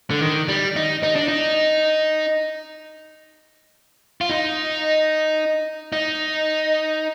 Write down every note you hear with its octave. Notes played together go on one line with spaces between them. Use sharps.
D3
D#3
G3
D#4
D#4
D4
D#4
F4
D#4
D#4